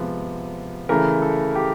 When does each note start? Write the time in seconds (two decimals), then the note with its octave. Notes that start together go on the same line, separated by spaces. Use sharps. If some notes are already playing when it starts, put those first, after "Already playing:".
Already playing: C3 F3 G#3 B3
0.89 C#3 E3 A3 A#4
1.22 A4
1.55 G4